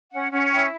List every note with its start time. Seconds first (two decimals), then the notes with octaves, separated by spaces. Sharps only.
0.12 C#4 F#5
0.32 C#4 F#5
0.51 E4 G5